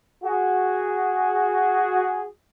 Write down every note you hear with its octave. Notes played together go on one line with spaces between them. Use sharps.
F#4 G#4